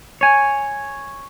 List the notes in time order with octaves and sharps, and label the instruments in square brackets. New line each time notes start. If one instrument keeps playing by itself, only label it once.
[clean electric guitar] C#5 G#5